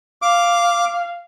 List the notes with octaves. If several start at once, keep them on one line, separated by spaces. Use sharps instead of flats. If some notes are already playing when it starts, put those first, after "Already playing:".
F5 D6